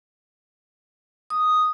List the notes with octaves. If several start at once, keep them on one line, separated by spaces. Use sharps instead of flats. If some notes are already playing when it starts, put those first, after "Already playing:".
D#6